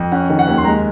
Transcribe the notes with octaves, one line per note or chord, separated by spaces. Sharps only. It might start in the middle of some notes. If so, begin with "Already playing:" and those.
Already playing: F2
C#4 F#5
D#3
F#5
D#2
C6
G#3 A#5